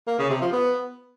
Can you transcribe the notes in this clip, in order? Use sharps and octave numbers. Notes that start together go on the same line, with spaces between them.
A#3
C#3
C3
F3
B3